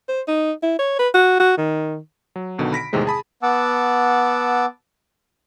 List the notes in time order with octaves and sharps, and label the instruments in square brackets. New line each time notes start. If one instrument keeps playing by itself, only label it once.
[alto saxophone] C5
D#4
E4
C#5
B4
F#4
F#4
D#3
[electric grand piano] F#3
B1 B2 D3 D#3
B5 A#6 B6 D7
E2 A2 C3 D#3 G#3 C4
G#4 A5 B5 D#6
[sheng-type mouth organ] B3 F#5 A5 D6 E6